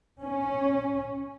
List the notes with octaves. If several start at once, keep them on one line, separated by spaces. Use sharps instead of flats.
C#4